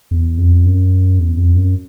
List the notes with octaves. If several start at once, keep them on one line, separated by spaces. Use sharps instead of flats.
E2
F2
F#2
E2
F2
F#2